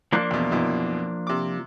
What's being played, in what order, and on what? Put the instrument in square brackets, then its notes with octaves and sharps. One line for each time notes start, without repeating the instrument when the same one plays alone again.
[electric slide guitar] F3 A#3 D4
[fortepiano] E2 B2
F#2 B2 E3
C3 D6